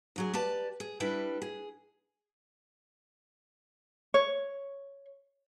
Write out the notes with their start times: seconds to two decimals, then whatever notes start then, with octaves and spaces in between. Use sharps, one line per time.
0.16 D2 F#3 G#4
0.34 G4 B4 D5 A5
0.80 G#4
1.00 G3 D4 E4 B4 G5
1.42 G#4
4.14 C#5